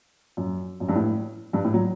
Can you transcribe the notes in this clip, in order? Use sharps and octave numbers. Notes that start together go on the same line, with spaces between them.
F#2
F#2
G2
A2
G2
A2
F#3